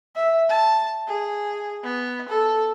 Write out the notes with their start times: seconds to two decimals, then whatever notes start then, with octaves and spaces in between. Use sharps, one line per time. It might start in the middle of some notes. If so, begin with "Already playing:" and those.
0.16 E5
0.49 A5
1.08 G#4
1.84 B3
2.29 A4